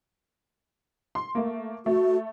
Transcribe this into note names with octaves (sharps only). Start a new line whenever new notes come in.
C6
A3 A#3
A3 F#4